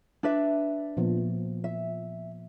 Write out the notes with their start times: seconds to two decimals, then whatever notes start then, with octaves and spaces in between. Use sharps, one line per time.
0.23 D4 B4 E5
0.97 A#2 F3 B3
1.64 E5